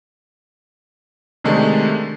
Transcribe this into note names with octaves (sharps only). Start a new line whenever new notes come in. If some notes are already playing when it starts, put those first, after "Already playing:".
C3 D#3 G#3 A3 D4